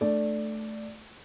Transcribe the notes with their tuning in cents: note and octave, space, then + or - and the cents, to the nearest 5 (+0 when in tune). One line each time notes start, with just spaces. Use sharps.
A3 -5 D4 +20 D5 +0